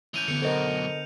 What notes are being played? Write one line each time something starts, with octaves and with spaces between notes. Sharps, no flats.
E3 C#4 G6 D#7 F7
D3 B3 C#7
F#2 B2 A4 A#4 C5 D#5